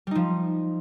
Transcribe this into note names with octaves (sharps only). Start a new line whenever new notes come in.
F3 G3 D#4